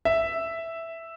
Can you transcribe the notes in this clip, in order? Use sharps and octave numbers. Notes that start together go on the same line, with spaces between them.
E5